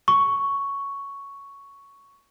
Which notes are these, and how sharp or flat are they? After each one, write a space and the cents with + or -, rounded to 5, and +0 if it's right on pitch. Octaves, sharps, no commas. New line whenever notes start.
C#6 +5